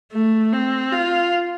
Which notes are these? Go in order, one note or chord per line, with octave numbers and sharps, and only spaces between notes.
A3
C4
F4